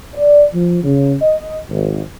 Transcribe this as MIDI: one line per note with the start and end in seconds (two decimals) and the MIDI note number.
0.14 0.44 74
0.53 0.79 53
0.84 1.14 49
1.22 1.57 75
1.70 2.00 32